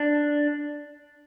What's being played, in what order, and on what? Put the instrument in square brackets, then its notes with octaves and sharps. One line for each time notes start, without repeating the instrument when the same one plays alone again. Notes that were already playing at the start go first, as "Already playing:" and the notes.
Already playing: [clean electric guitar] D4